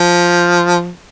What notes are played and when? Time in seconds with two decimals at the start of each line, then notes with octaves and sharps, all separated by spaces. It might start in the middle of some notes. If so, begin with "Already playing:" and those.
Already playing: F3